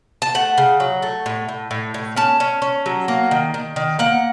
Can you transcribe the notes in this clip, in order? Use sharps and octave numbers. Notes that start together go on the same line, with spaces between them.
A5
A3 F#5
C#3
F#3
A3
A2
A2
A2
A2
C#4 A5
C#4
C#4
F#3
A#3
D#3
D#3
D#3
A#3 F#5